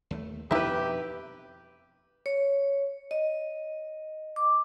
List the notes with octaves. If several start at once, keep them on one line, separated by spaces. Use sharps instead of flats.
D#2 G#3 A3
F2 B2 F3 D#4 E4 G4 B4 E5
C#5
D#5
D6